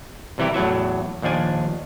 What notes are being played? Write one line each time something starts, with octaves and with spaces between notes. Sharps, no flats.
C2 C3 E3 E4 G4
E2 A2 F#3 E5
A#1 D#2 F3 D4 G#5